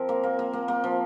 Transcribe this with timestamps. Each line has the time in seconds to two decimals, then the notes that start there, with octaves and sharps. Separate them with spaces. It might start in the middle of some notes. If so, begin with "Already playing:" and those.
Already playing: F3 C4 A#4
0.09 A#3
0.23 A#3
0.39 A#3
0.53 A#3
0.68 A#3
0.84 F3